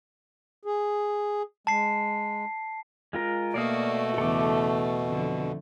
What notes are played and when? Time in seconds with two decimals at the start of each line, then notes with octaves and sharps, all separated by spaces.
0.65 G#4
1.67 G#3 A5 C7
3.13 G#3 F4 A#4
3.54 B2 A3 A#3 F#4 D5 F5 D#6
4.18 E2 C#3 A4 D6
5.06 F2 D3